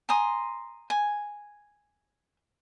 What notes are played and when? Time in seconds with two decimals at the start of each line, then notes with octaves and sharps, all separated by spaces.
0.09 G#5 A#5 C6 D#6
0.90 G#5